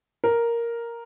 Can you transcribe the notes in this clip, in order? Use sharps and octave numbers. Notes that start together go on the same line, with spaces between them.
A#4